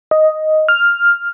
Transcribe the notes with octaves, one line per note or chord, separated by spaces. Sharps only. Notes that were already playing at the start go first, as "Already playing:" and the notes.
D#5
F6